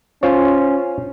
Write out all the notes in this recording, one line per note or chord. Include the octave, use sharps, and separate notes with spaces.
C#4 F4 C5 C#5